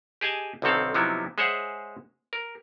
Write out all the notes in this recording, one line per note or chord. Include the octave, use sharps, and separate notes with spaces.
G4 G#4 D#5 G#5 A5
B1 D3 D#3 C4 A4 F5
C3 F3 F#3 B3 D#4 E4
G#3 G#4 C5 C#5 E5 F#5
A#4